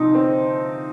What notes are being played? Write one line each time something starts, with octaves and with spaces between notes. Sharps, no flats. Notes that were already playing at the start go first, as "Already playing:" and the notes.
Already playing: C3 F3 D#4
C4